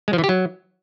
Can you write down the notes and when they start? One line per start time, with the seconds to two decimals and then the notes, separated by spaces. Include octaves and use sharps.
0.08 G#3
0.13 F3
0.18 E3
0.24 G4
0.29 F#3